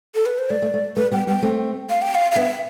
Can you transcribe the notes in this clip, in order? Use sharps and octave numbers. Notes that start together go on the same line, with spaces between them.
A4
B4
C5
A3 D5
A3
A3
A3 B4
G3 B3 G5
G3 B3 G5
A3 C4
F5
G5
F5
F5
B3 D4 E5